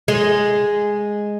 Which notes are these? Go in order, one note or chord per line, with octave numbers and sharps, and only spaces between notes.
G#3